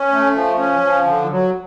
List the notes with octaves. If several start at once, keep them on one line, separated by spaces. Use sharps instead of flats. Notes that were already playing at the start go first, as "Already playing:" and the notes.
Already playing: C#4
A3
F3
C#4
F3
D3
F#3